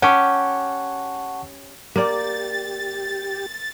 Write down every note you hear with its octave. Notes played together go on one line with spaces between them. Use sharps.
C#4 G4 F#5 A5 C#6
A#3 G4 D5 A6